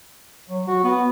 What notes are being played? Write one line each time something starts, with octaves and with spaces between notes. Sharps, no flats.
F#3
F#4
B3